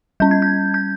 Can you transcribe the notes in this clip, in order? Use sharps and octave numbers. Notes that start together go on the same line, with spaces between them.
G3 C#4 G6
G#6
G6
G6